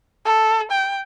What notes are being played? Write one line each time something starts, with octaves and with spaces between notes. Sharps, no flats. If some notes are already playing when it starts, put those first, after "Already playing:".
A4
G5